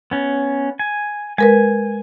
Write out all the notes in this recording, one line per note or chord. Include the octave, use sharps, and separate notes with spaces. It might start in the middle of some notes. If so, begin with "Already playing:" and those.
B3 C#4
G#5
G#3 A#4 B4 G#5